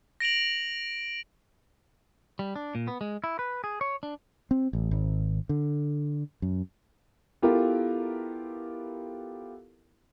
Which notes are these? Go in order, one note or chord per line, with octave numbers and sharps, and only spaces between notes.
A#6 D7 F7 F#7
G3
D4
A#2
B3
G#3
E4
B4
G#4
C#5
D4
C4
A1
G#1
D3
F#2
B3 E4 F4 G4 A4 A#4